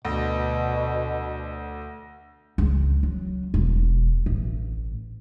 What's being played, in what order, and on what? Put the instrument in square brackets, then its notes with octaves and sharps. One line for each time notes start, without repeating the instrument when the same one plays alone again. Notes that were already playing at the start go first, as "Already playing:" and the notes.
[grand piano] D2 [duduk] B2
[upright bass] C#2
F#3
E1
A1